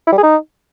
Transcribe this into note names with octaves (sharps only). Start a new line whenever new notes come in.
E4
G3
G#4
D#4